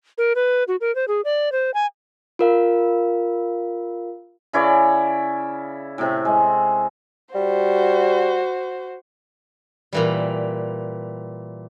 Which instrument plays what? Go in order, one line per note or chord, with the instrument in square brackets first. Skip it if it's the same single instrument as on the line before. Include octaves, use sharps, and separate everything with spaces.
[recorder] A#4
B4
F#4
A#4
C5
G#4
D5
C5
G#5
[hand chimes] F4 A#4 F5
[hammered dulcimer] C#3 E4 C#5 D5
A2 C3
G#3
[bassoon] G3 [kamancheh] F#4 C5
[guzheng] A#2 E3 G3